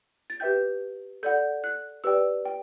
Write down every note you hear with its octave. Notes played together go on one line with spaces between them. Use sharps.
A6
G4 B4 E5 G5 G6
A4 D5 F#5 G6
F#6
G4 B4 D5 G5 E6
G5